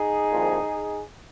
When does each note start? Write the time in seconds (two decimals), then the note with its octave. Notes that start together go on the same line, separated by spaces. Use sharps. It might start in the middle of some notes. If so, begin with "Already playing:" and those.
Already playing: D#4 G#4
0.30 C2 A#2 F3